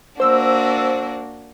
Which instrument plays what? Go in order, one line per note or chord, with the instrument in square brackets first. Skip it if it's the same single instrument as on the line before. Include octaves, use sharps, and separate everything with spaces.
[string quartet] A#3 D4 F#4 [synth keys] C5 E6